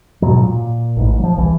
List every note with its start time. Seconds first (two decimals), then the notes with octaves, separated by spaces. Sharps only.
0.22 G#2 B2 F#3
0.43 A#2
0.96 A1 G#2
1.19 F3 F#3
1.38 C2 E3